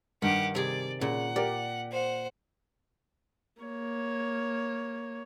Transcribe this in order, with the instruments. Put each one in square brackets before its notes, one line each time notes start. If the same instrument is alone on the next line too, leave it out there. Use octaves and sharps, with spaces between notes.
[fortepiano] G2 [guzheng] D#3 [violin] G4 F#5
[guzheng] C3 G#4 [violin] D5
[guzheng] A#2 [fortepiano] C#3 [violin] F#5
[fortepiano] G4 A#4 [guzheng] D5
[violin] C5 F#5
[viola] A#3 C#5